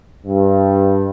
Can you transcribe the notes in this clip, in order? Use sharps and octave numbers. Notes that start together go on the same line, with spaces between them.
G2